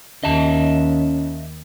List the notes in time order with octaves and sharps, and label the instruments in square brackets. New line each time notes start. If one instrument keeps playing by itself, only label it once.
[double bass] D#2 [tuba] C#4 [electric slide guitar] D#5 E5 A5